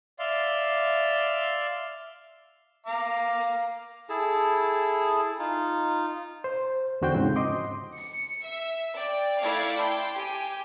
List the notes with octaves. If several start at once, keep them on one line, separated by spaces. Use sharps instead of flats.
D5 E5 F5 C6
F5 A#5 D6
E4 G#4 A4 A5
D#4 F4
C5
E2 D3 F#4 C5 G5 G6
G#2 C#3 F3 C4
D#5 C6 D6
C#7
E5
D5 G5
A3 E4 D5 F5 A5 G#6
G5 A5 C6
G4 G#5